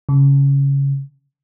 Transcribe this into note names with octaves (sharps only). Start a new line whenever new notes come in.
C#3